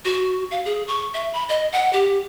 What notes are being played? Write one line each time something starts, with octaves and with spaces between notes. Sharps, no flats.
F#4
F5
G#4
C#6
E5
B5
D#5
F#5
G4